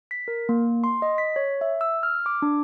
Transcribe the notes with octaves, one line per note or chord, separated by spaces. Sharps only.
B6
A#4
A#3
C6
D#5
B6
C#5
E5
E6
F6
D6
D4